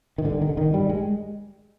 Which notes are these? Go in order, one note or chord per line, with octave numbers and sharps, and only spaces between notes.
D#3
G2 D3
D#3
D3
D#3
G2 G3
G#3